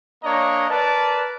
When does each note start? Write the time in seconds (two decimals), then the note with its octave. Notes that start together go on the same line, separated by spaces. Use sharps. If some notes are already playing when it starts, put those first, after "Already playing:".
0.24 A#3 D4 C#5 D#5 A#5
0.69 A#4 B4 D5 A5